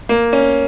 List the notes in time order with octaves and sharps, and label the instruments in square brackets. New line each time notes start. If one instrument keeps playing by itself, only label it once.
[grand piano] A#3
C#4